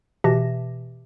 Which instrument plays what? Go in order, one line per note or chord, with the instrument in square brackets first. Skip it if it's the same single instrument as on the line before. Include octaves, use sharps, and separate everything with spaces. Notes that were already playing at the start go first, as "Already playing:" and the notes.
[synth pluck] B2 E3 G4 E5 A5 A#6